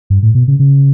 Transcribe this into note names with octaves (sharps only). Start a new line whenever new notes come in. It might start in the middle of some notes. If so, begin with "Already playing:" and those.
G2
A2
B2
C#3
C#3